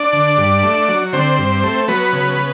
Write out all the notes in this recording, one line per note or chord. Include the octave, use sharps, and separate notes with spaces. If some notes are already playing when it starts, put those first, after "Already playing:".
Already playing: D4 D5
D3
G2
A3
F#3
D3 C4 C5
G2
A3
F#3 B3 B4
C#3